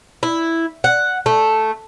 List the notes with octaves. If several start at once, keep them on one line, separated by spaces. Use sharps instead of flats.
E4
F#5
A3